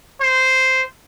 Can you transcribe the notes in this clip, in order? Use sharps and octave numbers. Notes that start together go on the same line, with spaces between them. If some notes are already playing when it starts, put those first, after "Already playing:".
C5